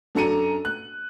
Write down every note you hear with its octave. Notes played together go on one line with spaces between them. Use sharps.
F#2 D4 A4 A#5 C#7 D#7
F#6